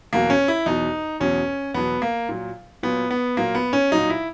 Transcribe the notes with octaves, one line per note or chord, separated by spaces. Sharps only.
E2 B2 F#3 A#3
C#4
E4
E2 B2 F#3 D#4
E2 B2 F#3 C#4
E2 B2 F#3 B3
A#3
A#2 F#3
A#2 F#3 B3
B3
A#2 F#3 A#3
B3
C#4
A#2 F#3 D#4
E4